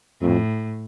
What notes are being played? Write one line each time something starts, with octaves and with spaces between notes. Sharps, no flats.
F2 A2